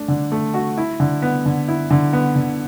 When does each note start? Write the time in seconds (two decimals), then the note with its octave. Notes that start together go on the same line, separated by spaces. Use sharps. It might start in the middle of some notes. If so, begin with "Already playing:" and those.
Already playing: A3 D4
0.08 D3
0.32 A3
0.54 F#4
0.77 E4
1.00 D3
1.22 B3
1.46 D3
1.68 E4
1.91 D3
2.13 B3
2.36 D3